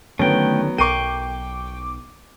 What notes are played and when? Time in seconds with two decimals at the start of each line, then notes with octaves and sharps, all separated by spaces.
0.19 D3 D#3 F#3 A3 B3 C#4 G5
0.78 B1 A#4 G5 C#6 D6 C7 D#7